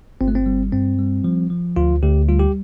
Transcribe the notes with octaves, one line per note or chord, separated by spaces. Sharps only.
G1 C4
A3
C4
G3
G2 C4
G3
F3
F3
D2 F4
D2 G4
G3 F4
G4